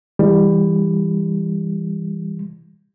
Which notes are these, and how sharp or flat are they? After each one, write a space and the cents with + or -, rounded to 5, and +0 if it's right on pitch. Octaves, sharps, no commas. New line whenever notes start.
E3 +0 G3 +25